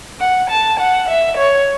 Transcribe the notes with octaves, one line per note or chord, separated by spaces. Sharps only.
F#5
A5
F#5
E5
C#5